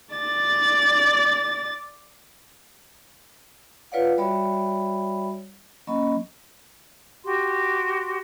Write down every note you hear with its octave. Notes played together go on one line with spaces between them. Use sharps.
D5 A6
F4 B4 C#5 D5 F5 F#5
G3 F#4 C#5 D5 E5 B5
F#3 A#3 C#4 D#5 B5
F#4 G4 C6